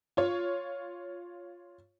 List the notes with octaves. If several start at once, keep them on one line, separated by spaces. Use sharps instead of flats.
F4 C#5